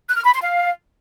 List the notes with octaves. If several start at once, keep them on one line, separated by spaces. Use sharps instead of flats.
F#6
F6
B5
C6
F5